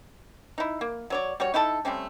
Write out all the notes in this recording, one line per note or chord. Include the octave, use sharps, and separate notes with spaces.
D#4 E4
A#3
F#3 C#5 D5
G3 F#4 C#5
D#4 E4 A4 A5
G3 A3 C4 C#4